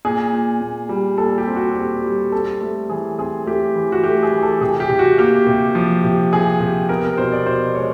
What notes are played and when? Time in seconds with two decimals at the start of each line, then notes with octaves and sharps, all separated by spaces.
0.05 A#2 G#4
0.33 A#2
0.61 A#2
0.89 G3
1.18 A#2 A4
1.38 G4
1.47 C4
1.56 F#4
1.75 A#2 G4
2.04 G3
2.32 C4 A4
2.61 A3
2.90 E3 G#4
3.19 C4 G#4
3.46 A3 G4
3.76 E3
3.92 F#4
4.04 A3 G4
4.23 G#4
4.32 E3
4.43 A4
4.61 C3 G#4
4.80 G4
4.90 C3
4.99 F#4
5.18 A#3 G4
5.47 C3
5.75 F3
6.04 C3
6.33 C3 G#4
6.60 C3
6.89 B3 A#4
7.04 A#4
7.18 B2 C5
7.32 D5
7.46 B2 C5
7.75 G#3 C#5